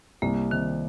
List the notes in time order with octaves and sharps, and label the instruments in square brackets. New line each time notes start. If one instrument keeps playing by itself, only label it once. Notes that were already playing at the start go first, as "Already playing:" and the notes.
[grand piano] C2 [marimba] A#3
[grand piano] C3 [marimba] D#3